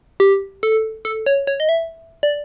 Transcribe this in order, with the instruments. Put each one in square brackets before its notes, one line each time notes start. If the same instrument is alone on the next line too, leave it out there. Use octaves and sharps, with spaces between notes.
[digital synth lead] G4
A4
A4
C#5
C#5
D#5
E5
D5